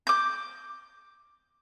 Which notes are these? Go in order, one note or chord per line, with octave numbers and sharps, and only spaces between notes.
D6 G6